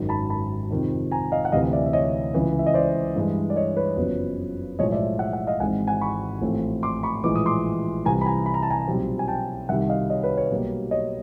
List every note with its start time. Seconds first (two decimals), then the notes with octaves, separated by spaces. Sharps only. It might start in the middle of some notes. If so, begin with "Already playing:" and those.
Already playing: G#1 F#2 D#3
0.09 A5 B5
0.30 A5 B5
0.71 F2 C3 D#3
1.11 G#5 A#5
1.32 D#5 F5
1.45 F#5
1.52 D2 C3 E3 D#5 F5
1.73 D5 E5
1.86 E5
1.93 C#5 D#5
2.34 C#2 C#3 E3
2.59 E5
2.67 D#5
2.74 C5 D5
3.16 G2 E3 G#3
3.50 D5
3.56 C#5 D#5
3.77 B4 C#5
3.97 F#1 F2 C#3 F#3 B3
4.79 B1 A2 F3 G#3 C#5 D#5
4.92 D5 E5
5.19 E5 F#5
5.33 E5 F#5
5.47 D#5 F5
5.60 G#1 G#2 E3 G#3 C4 F#5 G#5
5.88 F#5 G#5
6.01 B5 C#6
6.42 A1 A2 F3 A3 C4
6.83 C6 D6
7.03 B5 C#6
7.24 A#1 A2 E3 G#3 D6
7.35 D#6
7.46 C6 D6
8.05 C2 C3 E3 G#5 A#5
8.21 B5
8.26 G#5 A#5
8.46 B5
8.54 A#5
8.63 A5
8.70 G#5 A#5
8.87 B1 A#2 G3 C4
9.19 G#5
9.28 G5 A5
9.69 C2 C3 D#3 G3 E5 F#5
9.89 D#5 F5
10.10 C#5 D#5
10.23 B4 C#5
10.37 B4 C#5
10.51 B1 B2 G3 A#3
10.91 C#5 D#5